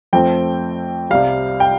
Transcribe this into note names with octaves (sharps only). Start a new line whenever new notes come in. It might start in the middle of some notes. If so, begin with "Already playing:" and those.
F2 F3 A3 C4 G5
C2 C3 G3 F5
G5